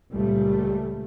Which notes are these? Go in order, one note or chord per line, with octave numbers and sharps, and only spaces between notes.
C#2 A#2 G3 A3